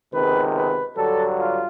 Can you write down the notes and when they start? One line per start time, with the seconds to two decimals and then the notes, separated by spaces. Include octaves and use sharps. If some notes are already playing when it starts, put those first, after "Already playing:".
0.12 C#2 C3 D#3 G#3 B3 B4
0.55 B4
0.96 G2 D3 F#3 A4
1.39 F4